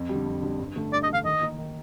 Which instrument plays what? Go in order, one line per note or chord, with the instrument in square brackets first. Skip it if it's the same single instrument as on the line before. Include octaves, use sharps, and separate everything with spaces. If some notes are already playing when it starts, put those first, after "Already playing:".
Already playing: [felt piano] F2
G3
D3
F2
D3 G3
G2
D3 A3
[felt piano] G2 [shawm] D5
[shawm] D#5
[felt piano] D3 A3 [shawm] F5
[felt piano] D#3 [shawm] D#5
[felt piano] A#3 D#4
D#3